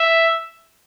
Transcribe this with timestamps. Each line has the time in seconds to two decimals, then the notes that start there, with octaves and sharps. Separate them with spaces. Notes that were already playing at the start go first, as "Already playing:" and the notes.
Already playing: E5